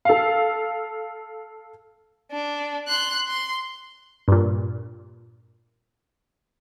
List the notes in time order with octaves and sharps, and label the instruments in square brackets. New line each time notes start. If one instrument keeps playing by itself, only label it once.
[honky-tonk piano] A4 F5
[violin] D4
C6 F#6
C6
[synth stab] G2 A#2